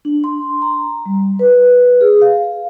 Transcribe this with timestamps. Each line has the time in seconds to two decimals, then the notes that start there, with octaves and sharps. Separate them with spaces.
0.05 D4
0.24 C6
0.62 A#5
1.06 G3
1.39 B4
2.01 G#4
2.21 F5